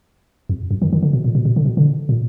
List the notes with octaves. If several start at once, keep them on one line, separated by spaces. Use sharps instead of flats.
F2
F#2
D#3
D#3
D3
B2
A#2
B2
B2
D3
B2
D3
A#2